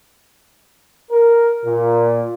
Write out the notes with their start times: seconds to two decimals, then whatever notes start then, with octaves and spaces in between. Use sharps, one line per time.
1.12 A#4
1.66 A#2